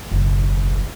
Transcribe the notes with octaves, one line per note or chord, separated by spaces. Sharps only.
F#1 B1